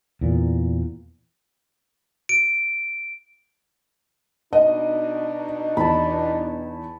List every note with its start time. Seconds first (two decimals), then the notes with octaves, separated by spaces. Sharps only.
0.21 E2 A#2
2.29 D7
4.53 B2 D4 D#4 D#5
5.77 E2 A5 B5